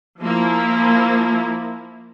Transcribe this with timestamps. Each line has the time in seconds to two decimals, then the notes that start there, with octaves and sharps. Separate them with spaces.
0.22 F3 A#3 E4